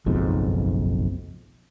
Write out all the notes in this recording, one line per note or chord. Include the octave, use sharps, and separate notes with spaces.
F#1 B1 F2 G#2